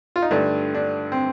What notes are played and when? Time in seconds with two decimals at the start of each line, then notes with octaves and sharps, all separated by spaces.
0.16 F4
0.22 D#4
0.31 G2 D3 A3 D4
0.74 D4
1.12 C4